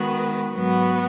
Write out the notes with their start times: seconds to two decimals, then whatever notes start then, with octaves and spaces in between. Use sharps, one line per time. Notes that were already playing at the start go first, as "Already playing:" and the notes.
Already playing: D#3 G#3 B3 F#4 B4
0.55 G#2 F#3 B3 F#4 B4